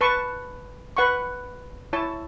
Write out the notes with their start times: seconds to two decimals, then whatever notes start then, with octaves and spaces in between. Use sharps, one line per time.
0.01 B4 A5 C#6
0.97 B4 F#5 C#6
1.93 E4 C#5 A5